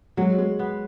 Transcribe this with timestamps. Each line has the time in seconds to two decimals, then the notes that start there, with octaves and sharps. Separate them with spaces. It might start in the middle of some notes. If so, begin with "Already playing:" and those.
0.17 F#3 G#3
0.38 G#3
0.59 B3